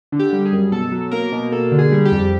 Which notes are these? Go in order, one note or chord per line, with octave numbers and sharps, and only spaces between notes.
D3
G4
G3
G#4
F#2
B2 A4
F#3
A#3 A#4
B2
A#3 A4
D3
G#4
G3
G4
F2